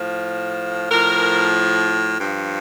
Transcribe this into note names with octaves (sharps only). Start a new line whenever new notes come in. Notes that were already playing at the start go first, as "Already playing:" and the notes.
Already playing: A2 F3
A2 F3 A#4
G2 F3